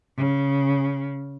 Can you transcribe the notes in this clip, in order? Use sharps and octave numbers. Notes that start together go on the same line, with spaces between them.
C#3